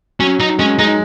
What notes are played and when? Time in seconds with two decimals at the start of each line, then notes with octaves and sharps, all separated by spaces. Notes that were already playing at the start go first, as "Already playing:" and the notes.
0.19 F#3 C#4
0.40 D#4
0.59 G#3 C#4
0.79 G#3 D#4